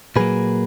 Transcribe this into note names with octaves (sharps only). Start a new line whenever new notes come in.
A#2 F#3 A#3 G#4 B4